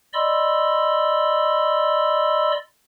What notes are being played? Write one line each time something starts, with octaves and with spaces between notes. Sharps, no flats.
D5 D#5 B5 C6 E6